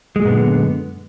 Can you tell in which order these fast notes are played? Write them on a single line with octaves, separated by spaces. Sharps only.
G#3 A#2 F#2 B3 D3